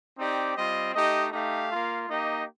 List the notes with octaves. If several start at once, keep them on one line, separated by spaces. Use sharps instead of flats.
C4 D#4 G4 D5
G3 C4 F4 D#5
A3 D#4 G4 D#5
A3 D#4 G4 F5
A#3 F4
A#3 D#4 G4 D#5